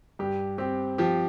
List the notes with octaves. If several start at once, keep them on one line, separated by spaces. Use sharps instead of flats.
G2 G4
C4 G4
F3 G4